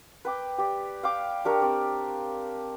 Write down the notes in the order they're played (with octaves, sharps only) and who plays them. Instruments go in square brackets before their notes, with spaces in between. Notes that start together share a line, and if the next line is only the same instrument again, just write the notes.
[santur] B4 G5 D6
G4 D5
F5 G5 D6
D4 G4 A#4 C#5
C4 G4 D5